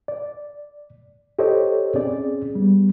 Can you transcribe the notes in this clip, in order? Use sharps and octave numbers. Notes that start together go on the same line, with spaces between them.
D5
G4 A4 C5 C#5 D#5
C4 C#4 G#4 D5
G3 B3